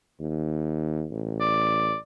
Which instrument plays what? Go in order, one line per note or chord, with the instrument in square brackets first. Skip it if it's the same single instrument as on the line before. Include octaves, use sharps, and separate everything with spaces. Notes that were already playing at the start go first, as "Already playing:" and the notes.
[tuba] D#2
A1
[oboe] D5